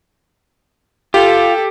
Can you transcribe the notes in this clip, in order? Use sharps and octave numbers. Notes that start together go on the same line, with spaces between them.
F4 G4 A4